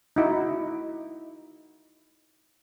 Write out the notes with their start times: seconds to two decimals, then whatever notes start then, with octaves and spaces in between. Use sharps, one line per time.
0.16 D#4 E4 F#4